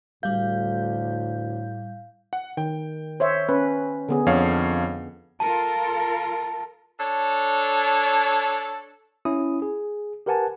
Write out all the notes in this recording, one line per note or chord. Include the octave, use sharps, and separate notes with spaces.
D2 A2 G3 F5 G6
F#5
D#3 G5
C5 C#5 E5
C#4 B4
D3 B3 G#4
F2 D4 C#5 F5
F4 A4 A#4 A5
D4 A4 C#5
C#4 E4 D#6
G#4
G4 A#4 B4 F#5 G#5 A5